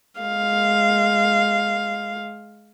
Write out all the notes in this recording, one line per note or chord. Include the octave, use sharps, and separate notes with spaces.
G#3 F5